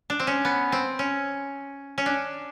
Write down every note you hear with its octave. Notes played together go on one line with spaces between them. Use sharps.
D4
C4
C#4
B3
C4
C#4
C#4
D4